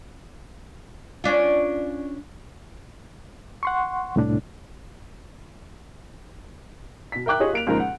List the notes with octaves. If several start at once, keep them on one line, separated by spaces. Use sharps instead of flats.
C#4 D4 F4
F#5 C6 C#6
C2 A2 D4
B2 B6
A#4 E5 G5 D6 F#6
F4 G4 G#4 C#5 D#5
A#3 D7 F7
C#2 A#2 F3 D#4 A#4
F#5